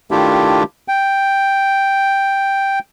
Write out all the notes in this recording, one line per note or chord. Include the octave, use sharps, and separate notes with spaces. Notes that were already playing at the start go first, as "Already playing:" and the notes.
D#3 A3 D4 E4 F4 G4
G5